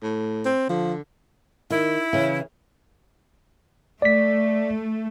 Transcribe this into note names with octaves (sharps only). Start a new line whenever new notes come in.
A2
C4
D3 F3
D#3 E4
C#3 E3
A3 D5 B6